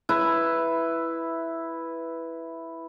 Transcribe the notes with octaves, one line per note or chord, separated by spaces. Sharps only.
E4 B4